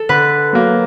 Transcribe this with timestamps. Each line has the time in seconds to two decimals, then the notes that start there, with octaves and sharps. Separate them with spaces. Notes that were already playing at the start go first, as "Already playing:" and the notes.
Already playing: A4
0.09 D3 B4
0.53 F#3 A#3